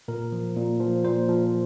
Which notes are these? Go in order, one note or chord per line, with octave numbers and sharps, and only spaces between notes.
A#2 A#4
F3
A#2
F3
A#2 C5
F3